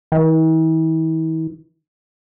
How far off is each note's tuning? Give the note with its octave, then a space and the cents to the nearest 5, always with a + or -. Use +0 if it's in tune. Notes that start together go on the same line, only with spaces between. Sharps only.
E3 -45